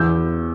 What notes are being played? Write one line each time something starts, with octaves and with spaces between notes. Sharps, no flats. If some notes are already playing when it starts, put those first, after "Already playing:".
Already playing: E2 E6 G6